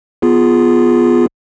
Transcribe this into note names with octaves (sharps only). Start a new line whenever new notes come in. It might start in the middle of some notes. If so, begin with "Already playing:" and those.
B3 F4 G#4